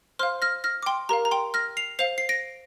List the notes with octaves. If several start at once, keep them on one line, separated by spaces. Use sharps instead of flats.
C5 F5 C6 F6
F6 A#6
F6 A#6
D6
G5 C6
G4 A#4 F5 A#5
A#5
G5 C6
F6 A#6
C7 F7
C5 F5 C7 F7
C7
A#6 D7